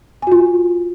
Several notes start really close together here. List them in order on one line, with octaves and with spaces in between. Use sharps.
G#5 F#4 F4